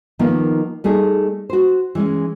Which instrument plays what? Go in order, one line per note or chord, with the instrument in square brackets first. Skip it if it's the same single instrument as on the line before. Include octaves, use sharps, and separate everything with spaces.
[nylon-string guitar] D#3 F3 A#3 B3 D#4
G3 A3 D#4 G#4
F#4 C5
E3 G#3 C#4